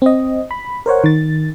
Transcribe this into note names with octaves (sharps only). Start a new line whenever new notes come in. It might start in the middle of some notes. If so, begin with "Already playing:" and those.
C4 D#5
B5
A#4 C5 C#5 F#5
D#3 A6